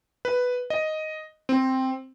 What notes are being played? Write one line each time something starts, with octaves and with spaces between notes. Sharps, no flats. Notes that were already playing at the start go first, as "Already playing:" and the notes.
B4
D#5
C4